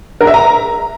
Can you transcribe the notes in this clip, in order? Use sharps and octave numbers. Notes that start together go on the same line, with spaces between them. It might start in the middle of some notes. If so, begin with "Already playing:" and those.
A#4
E5
A#5